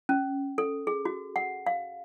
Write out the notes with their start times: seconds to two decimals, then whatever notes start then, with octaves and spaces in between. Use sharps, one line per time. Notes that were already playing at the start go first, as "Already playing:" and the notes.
0.09 C#4
0.58 A4
0.87 G#4
1.05 F#4
1.36 F#5
1.66 F5